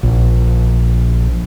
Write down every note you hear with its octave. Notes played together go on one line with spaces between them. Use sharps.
A#1